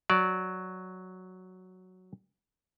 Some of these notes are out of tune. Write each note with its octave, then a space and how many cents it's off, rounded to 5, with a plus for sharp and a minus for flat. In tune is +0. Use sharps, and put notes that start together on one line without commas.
F#3 +0 D5 -5